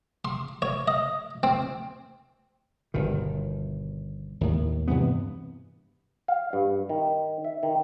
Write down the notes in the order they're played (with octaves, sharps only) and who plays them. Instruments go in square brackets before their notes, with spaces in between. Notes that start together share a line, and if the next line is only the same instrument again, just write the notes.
[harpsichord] C6
C#5
D#5
C4
[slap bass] G1 B2 D#3
D#2 A2
G2 C3 E3 B3
[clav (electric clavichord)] F5
G2
D#3
E5
D#3